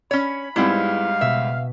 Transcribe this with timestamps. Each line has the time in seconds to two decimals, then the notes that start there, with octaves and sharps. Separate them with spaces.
0.11 C#4 C#5 B5
0.56 G#2 G3 G#3 B3 C4 E4 F5
1.21 B2 E5